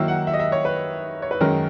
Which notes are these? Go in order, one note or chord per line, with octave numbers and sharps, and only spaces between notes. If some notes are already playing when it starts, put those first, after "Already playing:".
Already playing: D#3 F#3 A#3 E4 E6
F#5
E5
D#5
E5
C#5
B4
C#5
B4
F#2 D#3 G#3 C#4 A#4